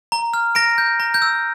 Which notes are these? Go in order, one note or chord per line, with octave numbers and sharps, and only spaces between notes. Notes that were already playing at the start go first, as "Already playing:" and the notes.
A#5
F6
A#5 A#6 D7
G6
A#5
G6
E6